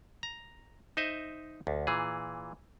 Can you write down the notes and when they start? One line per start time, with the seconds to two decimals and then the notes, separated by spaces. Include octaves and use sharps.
0.23 A#5
0.97 D#4 C5 D#5 E5
1.67 D2
1.87 A#2 E3 G#4